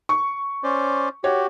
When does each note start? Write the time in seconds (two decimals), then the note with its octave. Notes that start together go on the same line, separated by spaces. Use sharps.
0.09 C#6
0.64 C#4 C5 D5
1.24 F#4 G4 C#5